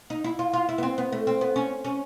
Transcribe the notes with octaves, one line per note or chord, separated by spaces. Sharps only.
D#4
E4
F4
F4
E4
B3
C4
B3
A3
C4
B3
C#4
C#4